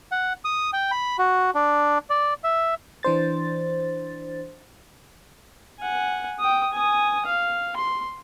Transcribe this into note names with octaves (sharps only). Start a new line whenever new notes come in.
F#5
D#6
G5
B5
F#4
D4
D5
E5
E3 D4 C5 A6
F#5 G#5
G5 D#6
G#5 D#6
F5
C6